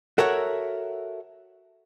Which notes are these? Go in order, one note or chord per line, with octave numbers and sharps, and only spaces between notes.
F#4 A4 A#4 C#5 E5 F#5